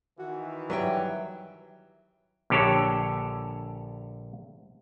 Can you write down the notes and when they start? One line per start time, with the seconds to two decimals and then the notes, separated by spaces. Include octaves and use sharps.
0.19 D#3 E3 F#4
0.70 F#3 G3 B4 E5 G5
2.50 A#1 D3 G4 A4 C#5